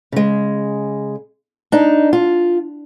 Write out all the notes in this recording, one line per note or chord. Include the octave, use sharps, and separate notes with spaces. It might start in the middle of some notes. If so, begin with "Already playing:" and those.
C#3 G#3
D4 D#4
F4